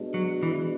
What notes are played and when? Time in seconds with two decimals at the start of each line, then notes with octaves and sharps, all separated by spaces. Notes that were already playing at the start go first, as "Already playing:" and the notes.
Already playing: B2 G#3 D4
0.14 F#3
0.43 E3